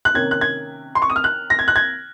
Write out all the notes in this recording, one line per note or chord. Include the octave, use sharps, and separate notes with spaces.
F#6
C3 D#3 A#3 C#4 G#6
F#6
G#6
C6
C#6
D#6
F6
F#6
A#6
G#6
F#6
G#6